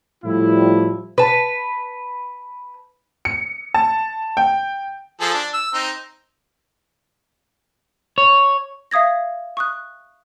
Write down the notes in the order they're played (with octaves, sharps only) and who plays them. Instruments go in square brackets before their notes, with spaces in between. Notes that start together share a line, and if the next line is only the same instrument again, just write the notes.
[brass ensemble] A2 F3 G3 E4
[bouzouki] B4 A5
[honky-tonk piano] C#7
A5
G5
[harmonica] F3 G#4 A4
D4
E6
C4 D#4
[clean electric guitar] C#5
[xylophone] E5 F5 D#6 G#6 A#6
C#6 D#6 F#6